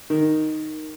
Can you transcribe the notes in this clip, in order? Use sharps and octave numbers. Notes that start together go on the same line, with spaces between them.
D#3